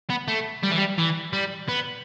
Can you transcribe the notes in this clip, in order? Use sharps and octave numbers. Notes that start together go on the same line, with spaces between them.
B3
A3
G3
E3
G3
E3
G3
B3